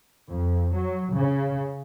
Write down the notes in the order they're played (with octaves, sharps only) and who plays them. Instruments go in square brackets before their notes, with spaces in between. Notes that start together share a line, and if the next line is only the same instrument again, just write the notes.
[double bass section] F2
F#3
C#3